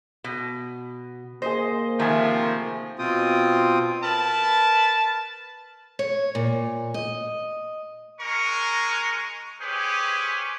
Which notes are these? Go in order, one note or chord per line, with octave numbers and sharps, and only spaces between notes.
B2
A#3 G#4 C5 D#5
C3 D#3 F3 A3 E5 G#5
B2 C4 F4 G5 D#6
A#4 B4 A5
C#5
A#2
D#5
G#3 A#4 C#6
C#4 G4 G#4 B4 C5